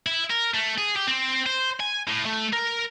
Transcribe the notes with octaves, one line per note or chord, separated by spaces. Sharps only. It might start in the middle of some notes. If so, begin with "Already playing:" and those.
E4
A#4
A3
G#4
G4
C4
C5
G#5
A2
A3
A#4